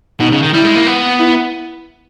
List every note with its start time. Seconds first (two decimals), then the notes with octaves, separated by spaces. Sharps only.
0.19 B2 D#4
0.32 C#3
0.42 D#3
0.53 G3 E4
0.65 G#3
0.76 A#3
0.87 B3
1.19 E4